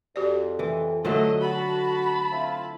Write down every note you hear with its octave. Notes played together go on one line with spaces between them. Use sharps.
F2 F#4 G4 D5
E3
D3 F#3 A3 F4 D#5
F#4 A5 B5
C4 E4 F4